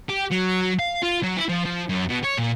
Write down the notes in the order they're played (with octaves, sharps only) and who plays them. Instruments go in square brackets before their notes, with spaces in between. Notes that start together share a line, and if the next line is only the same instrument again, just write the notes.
[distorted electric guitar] G4
F#3
F5
F4
F#3
E4
F3
F3
F#2
B2
C#5
A#2